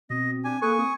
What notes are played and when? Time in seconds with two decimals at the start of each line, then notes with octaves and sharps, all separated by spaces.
0.10 B2 C4 D#5
0.44 D4 G4 G#5
0.62 A#3 G#4 A4 B4 G#5 C#6
0.79 C4 D#6